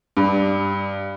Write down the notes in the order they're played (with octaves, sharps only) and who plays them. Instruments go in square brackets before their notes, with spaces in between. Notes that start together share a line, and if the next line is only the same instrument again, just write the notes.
[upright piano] G2